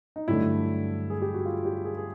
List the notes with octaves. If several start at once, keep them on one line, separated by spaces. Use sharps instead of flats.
D#4
G2 D3 F#3 A3 E4
G#4
G4
F#4
F4
G4
G#4
G#4